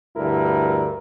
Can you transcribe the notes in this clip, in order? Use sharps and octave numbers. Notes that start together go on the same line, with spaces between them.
D2 G2 D3 E4 A#4